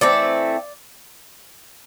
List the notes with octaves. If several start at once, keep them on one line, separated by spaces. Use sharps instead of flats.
E3 A3 C4 D5